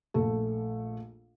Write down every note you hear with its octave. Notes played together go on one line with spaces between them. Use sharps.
A#1 A3 A4